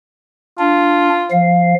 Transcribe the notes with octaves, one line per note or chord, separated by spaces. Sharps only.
D4 F4
F3 F5